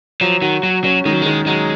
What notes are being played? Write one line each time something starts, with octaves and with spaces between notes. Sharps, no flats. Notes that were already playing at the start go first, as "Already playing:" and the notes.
F3 F#3
D#3 F#4
F#3 F#4
F#3 C#4
D#3 G#3
F#3
D#3 G#3
F#3 G#3